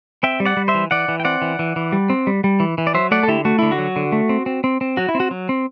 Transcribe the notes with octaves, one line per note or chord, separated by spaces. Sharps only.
C4 E5 G5
G3
D5 F#5
G3
C5 E5
E3
E3 D5 F#5
E3
G5
C4 D5 F#5
E3
E3
E3
G3
C4
G3
G3
E3
E3
D5
F#3 C5 E5
A3 D5 F#5
A4
D3 E4 G4
A3 F#4
D3 E4
F#4
F#3
D3
A3
C4
C4
C4
C4
F#3 F#4
E4
C4
F#4
F#3
C4